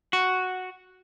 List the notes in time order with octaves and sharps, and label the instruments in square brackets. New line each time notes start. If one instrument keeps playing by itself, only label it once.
[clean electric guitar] F#4